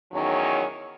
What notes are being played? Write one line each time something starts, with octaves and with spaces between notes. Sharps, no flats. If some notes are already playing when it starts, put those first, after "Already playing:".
E2 D#3 F#3 C#4